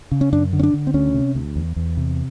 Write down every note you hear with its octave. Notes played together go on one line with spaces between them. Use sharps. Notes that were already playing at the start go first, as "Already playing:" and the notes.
C#3
C#4
F#2 D4
D3
C#4
D4
D3
C4
D2 C#4
C3
D2
E2
E2
C3